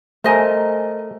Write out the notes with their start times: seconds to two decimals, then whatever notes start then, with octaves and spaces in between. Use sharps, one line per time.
0.24 A3 A#4 C5 D#5 G#5